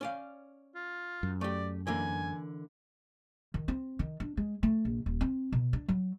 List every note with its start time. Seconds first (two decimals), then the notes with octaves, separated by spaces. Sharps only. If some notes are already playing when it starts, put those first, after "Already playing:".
0.01 C#4 D5 F5
0.75 F4
1.23 F#2
1.41 A3 G4 D5
1.87 D3 E3 A#3 G#5
3.54 D#3
3.68 C4
3.99 D#3
4.20 D4
4.37 G#3
4.63 A3
4.85 A#1
5.06 D#1
5.21 C4
5.52 B2
5.73 D4
5.88 F#3